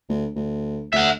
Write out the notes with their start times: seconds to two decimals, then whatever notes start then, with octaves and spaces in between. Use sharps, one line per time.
0.09 D2
0.36 D2
0.93 D2 E5 F#5